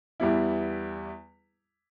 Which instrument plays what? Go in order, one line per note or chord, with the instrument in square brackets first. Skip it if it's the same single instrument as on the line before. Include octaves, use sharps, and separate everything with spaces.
[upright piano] E2 E3 G3 E4